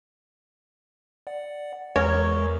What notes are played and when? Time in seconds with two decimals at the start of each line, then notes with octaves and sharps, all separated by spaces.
1.27 D5 F#5
1.96 E2 G#3 A#4 C#5 C#6